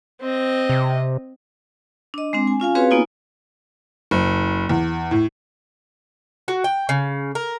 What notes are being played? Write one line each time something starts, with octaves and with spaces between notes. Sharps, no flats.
C4 D#5
C3
D4 D#5
G#3 C4 D4
G#5
C#4 F4 F5 G#5
C4 F#4 G#4 B4 C#5 F5
A#3 B3 D#4 F4 G#5
F#1
E2
A2
F#4
G5
C#3
A#4